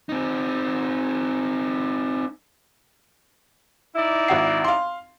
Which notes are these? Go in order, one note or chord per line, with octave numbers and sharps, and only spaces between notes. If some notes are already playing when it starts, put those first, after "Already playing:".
C4 D#4
D#4 E4 D5
G#1 F#5 C7
F5 C6